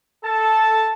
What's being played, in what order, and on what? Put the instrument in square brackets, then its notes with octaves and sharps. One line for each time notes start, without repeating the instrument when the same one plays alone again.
[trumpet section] A4 A5